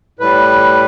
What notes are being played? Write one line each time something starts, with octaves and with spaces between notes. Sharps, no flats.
A2 G3 B4